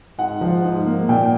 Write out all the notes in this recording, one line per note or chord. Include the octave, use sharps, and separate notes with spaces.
G#2 F#5
F3
G#2
A#3
A#2 G5